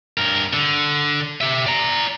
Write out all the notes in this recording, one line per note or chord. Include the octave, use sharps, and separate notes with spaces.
G2 A#4
D3
G4 E5
D5 A#5